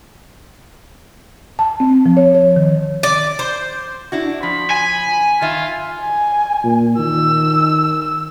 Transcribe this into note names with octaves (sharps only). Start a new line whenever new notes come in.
A5
C4
F3
C#5
C#5
D#3
D5
C5
D4 E4 F#4
F3 B5
G#5
D#3 F4 E5
G#5
A#2
D#3 E6